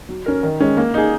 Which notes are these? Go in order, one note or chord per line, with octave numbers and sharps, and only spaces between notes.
F#3
C#4 A#4
D#3
G#3 C#4
A#3
D#4 G#4